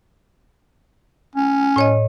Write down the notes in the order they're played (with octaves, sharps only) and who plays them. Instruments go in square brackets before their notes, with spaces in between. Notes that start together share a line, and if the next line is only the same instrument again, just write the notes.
[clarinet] C#4
[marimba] A2 C#5 D#5